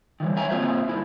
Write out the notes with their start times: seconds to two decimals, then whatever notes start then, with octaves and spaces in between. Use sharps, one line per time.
0.20 D#3 E3 G3
0.36 C#5 E5 G#5 A#5
0.50 A#3 C4 F4 C5 C#5 E5
0.89 G2 D3 E4